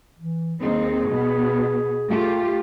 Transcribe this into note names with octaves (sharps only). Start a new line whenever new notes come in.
E3
D#2 C4 D#4 G#4
B2 B3
A3 F4 G4